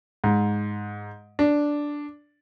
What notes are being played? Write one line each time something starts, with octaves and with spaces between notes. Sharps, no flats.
G#2
D4